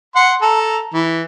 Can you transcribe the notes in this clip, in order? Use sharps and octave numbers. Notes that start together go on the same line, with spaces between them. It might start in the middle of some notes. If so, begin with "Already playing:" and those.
F#5 C6
A4 A#5
E3